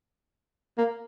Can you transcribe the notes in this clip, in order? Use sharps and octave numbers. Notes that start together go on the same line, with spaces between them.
A#3